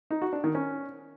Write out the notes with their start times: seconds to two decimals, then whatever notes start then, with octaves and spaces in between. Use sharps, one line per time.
0.11 D#4
0.22 F#4
0.33 D4
0.44 D#3
0.55 C#4